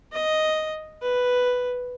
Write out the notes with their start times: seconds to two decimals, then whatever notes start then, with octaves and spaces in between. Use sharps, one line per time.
0.13 D#5
1.03 B4